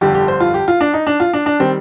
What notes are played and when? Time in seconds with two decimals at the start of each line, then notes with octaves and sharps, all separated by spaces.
0.01 G1 F2 D3 G3 G4
0.14 G4
0.28 C5
0.40 F4
0.54 G4
0.68 F4
0.81 D4
0.93 D#4
1.07 D4
1.20 F4
1.33 D4
1.46 D4
1.59 D#3 G3 C4